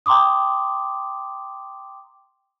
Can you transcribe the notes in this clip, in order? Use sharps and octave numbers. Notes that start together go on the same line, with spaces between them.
G5 A#5 C6 D6 D#6